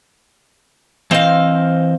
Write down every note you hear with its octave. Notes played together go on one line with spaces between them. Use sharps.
E3 C4 C5 D#5 F5